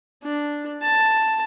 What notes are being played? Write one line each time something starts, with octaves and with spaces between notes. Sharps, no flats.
D4
A5